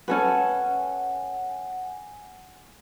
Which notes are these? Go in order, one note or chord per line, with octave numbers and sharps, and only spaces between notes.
C#4 A4 B4 F#5 G#5